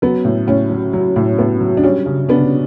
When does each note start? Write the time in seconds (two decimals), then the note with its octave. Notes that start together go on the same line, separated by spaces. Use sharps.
0.02 F#3 B3
0.25 A2
0.47 A2 C#4
0.70 F#3
0.93 F#3
1.16 A2
1.38 A2 B3
1.60 F#3
1.77 D4
1.84 G3 C#4
2.06 C#3
2.29 C#3 B3 D4